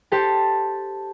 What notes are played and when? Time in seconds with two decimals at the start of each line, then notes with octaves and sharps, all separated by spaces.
0.12 G4 A4 C5 A5